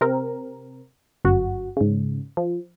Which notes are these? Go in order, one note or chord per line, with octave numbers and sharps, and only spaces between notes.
C3 C4 A#4
G1 F#2 F#4
G#2 C#3
F3